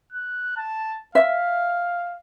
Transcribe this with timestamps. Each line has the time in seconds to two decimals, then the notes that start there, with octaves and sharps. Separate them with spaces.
0.13 F#6
0.57 A5
1.15 E5 F5